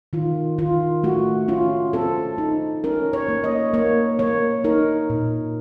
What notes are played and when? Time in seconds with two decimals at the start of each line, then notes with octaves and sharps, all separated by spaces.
0.13 D#3 F4
0.58 D#3 F4
1.04 A3 F#4
1.48 C#4 F4
1.93 C4 A4
2.38 D#4
2.84 C#4 A#4
3.13 C#5
3.28 A#3
3.44 D#5
3.74 A#3 C#5
4.19 A#3 C#5
4.64 D#4 A#4
5.10 A#2